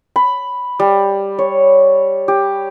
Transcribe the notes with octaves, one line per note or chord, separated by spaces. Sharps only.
B5
G3
C#5
G4